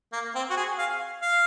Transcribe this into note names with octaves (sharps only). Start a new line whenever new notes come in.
A#3
C4
F#4
G#4
F5
F5